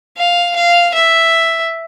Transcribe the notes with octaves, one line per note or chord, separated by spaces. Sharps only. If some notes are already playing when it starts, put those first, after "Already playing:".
F5
F5
E5